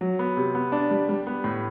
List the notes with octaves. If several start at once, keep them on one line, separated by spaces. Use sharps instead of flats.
F#3
B3
C3
B3
D4
G3
G3
B3
A2